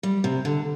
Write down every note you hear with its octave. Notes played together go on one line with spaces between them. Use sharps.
G3
C3
D3